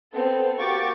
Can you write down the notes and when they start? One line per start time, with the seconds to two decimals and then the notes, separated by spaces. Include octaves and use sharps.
0.13 B3 C4 A4
0.59 A#3 F#4 G4 C#6 D6 A6